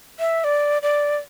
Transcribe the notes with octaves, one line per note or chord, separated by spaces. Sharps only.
E5
D5
D5